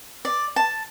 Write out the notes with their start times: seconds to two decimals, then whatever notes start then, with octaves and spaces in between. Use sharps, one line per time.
0.25 D5
0.56 A5